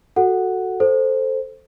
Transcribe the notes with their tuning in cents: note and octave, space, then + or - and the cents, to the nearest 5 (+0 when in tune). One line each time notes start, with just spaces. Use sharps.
F#4 +0 A4 +0 F#5 +0
A4 +0 C5 +0